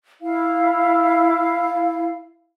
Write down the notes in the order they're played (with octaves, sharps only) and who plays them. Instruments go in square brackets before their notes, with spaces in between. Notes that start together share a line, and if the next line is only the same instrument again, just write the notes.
[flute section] E4 F5